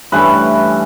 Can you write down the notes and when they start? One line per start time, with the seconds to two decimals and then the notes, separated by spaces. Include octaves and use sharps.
0.12 G2 E3 A3 C#4 B4